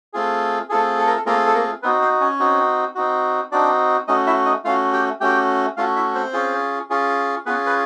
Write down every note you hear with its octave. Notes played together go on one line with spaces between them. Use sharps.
A3 C4 F4 G#4
A3 C4 F4 G#4 A4
A4
A#4
A4
A3 A#3 C4 F4 G#4 A#4
A4
A#3 A#4
B3 C4 D#4 F#4 B4
C4 C5
C#4 C#5
C4 D#4 F#4
C4 D#4 F#4
C4 D4 D#4 F#4 D5
A3 C#4 D#4 F#4 D#5
E4 E5
D#4 D#5
A3 C#4 F4 F#4 F5
G4 G5
A3 C#4 F#4 G4 G5
A3 C#4 F4 F#4 F5
E4 E5
C4 C5
C#4 F4 G#4
C#4 F4 G#4
B3 C#4 F4 G#4 B4
B4